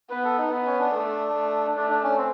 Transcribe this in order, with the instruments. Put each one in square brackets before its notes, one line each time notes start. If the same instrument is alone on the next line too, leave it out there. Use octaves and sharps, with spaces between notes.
[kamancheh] B3 [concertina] B4
[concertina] A4
D#4
[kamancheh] B3
[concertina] C#4
D4
[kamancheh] A3
A3
[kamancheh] A3 [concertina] D4
[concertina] D4
C#4
C4